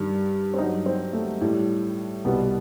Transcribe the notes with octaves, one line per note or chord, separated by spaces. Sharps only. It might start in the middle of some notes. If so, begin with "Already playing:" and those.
Already playing: G2 D#3 G3
C4
G2 F#3 D#4
C4
A3
A2 G3
C2 B2 G3 B3